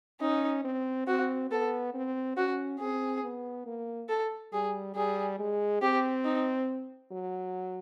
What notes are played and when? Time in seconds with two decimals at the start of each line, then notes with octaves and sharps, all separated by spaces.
0.21 C#4 D#4
0.64 C4
1.07 C4 F#4
1.51 B3 A4
1.94 C4
2.37 C#4 F#4
2.80 C4 G#4
3.23 B3
3.66 A#3
4.09 A4
4.53 G3 G#4
4.95 G3 G#4
5.39 G#3
5.82 C4 G4
6.25 D#4
7.12 F#3